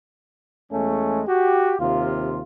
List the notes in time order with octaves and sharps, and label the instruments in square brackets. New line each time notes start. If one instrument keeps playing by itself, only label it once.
[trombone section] E2 G#3 A3 C#4
F#4 G4
D#2 C3 F4